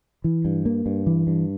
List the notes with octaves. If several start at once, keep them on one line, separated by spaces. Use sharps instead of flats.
E3
G2
A#3
G2
E3
G2